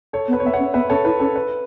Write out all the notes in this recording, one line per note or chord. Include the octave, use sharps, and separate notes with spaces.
A4 C#5
B3
B4
C#5
B3 E5
C#5 F#5
C#4
B3 B4 E5
C#4 A4 C#5
E4 B4
C#4 A4
B4